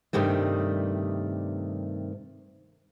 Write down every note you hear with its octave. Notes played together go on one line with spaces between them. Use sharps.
G2 C3 D#3 G3 A3